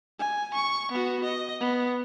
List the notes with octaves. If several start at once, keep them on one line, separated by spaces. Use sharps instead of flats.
G#5
C#6
B3 F#4
D#5
B3